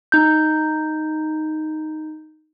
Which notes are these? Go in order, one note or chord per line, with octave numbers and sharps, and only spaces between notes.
D#4 G6